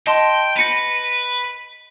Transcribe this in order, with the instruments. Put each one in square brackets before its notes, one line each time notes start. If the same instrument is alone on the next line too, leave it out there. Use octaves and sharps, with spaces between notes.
[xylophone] D#5 A5 C6 [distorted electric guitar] G5
[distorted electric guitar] B4 [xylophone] A#6 C#7 D#7